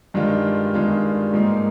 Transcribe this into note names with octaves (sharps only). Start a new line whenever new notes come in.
G2 D#3 G#3 D4 F4
G2 D#3 G#3 D4 F4
G#2 F3 A#3 D#4